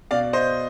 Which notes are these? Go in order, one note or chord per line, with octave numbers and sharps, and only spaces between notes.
B2 D5 F5
C5 D#5